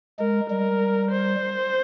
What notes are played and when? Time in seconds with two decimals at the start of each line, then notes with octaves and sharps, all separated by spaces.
0.19 G#3 A#4
0.50 G3 A#4
1.11 C5